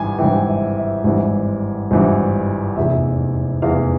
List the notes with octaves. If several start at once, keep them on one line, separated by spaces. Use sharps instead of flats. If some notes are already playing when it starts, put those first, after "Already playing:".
Already playing: G#1 G2 E3 G#5
G#1 G2 E3 G5
E5
E5
G#1 G2 E3
G#1 G2 E3
F1 E2 E3 E5
F1 E2 E3 F5